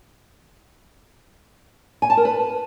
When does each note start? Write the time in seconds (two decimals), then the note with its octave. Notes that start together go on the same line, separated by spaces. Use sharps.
2.02 G#5
2.10 A5
2.17 A#4
2.25 B4